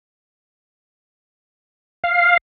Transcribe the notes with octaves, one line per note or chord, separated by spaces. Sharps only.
F5